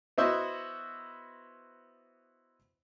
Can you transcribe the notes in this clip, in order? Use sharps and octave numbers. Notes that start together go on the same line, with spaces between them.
B3 E4 F#4 C5 D#5 E5